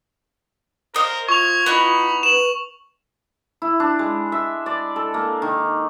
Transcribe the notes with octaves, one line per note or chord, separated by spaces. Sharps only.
A#4 C5 D#5 F5
F4 C#6 G#6 F7
B3 D#4 E4 B5
B4 E7 F#7
E4
D4
G#3
E5
D5
A4
A#3
D#3